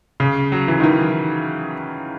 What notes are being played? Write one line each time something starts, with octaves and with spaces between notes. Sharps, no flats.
C#3
F#3
E3
D#3
E3